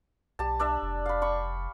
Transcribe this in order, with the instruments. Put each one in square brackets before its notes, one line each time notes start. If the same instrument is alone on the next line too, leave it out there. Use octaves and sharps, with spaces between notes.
[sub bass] B1 [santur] G4 A5
[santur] D4 D5 E5
[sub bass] F1
[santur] F5 B5
G5 B5 C#6